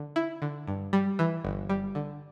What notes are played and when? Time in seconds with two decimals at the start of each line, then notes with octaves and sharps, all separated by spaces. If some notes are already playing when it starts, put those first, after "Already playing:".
Already playing: D3
0.16 E4
0.42 D3
0.68 G2
0.93 G3
1.19 E3
1.45 G1
1.70 G3
1.95 D3